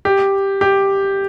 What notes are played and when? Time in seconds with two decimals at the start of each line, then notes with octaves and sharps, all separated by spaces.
0.05 G4
0.61 G4